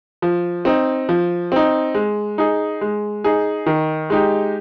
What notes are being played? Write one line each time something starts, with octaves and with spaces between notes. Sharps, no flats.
F3
C4 D#4
F3
C4 D#4
G#3
D#4 G#4
G#3
D#4 G#4
D#3
G#3 D#4 G4